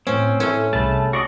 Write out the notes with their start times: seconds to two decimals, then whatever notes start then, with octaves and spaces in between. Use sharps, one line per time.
0.07 A2 C4 C#4 C5
0.40 A2 A3 C#4 E4 A4 B4
0.73 C2 A3 G#4 A5 B5
1.13 F#4 D5 D#5 C#6